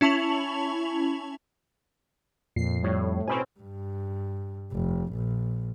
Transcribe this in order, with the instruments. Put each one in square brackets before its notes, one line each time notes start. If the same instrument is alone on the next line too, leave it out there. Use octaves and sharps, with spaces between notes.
[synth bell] C#4 E4 A5 C#6 F7 F#7
[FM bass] F2 [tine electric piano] A#2 [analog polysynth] C7
[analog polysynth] A2 [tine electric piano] G3 C#5
[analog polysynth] B2 C4 C#4 [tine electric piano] G#5 B5
[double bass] G2
F1
A#1